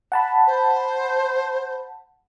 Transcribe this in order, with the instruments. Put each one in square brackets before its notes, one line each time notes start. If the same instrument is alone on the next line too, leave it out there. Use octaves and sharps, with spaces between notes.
[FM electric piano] F#5 A5 B5
[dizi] C5